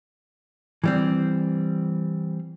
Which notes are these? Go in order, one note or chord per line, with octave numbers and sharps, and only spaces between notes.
E3 G3 C4